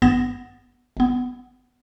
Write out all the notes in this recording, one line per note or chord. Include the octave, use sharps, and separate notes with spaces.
G#1 G2 B3 A6 A#6 E7
G1 B3